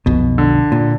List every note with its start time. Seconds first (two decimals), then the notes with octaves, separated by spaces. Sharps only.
0.06 B1 F2 B2
0.38 D3
0.72 A#2